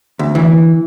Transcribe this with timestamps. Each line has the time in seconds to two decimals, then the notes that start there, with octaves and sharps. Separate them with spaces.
0.19 D2
0.35 E3